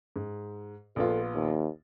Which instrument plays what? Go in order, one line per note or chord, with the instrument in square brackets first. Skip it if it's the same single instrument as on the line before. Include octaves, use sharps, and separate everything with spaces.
[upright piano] G#2
[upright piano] A#1 B3 F4 [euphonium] A4
[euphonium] D#2